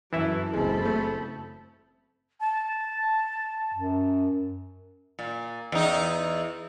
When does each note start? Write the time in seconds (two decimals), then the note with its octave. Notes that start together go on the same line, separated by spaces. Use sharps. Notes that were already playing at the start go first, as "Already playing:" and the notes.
0.13 F#2 E3 E4 A4 B4
0.54 F#1 G#3 C4 A4 B5
0.85 A3
2.40 A5
3.74 F#2
5.19 A#2
5.72 E2 D#4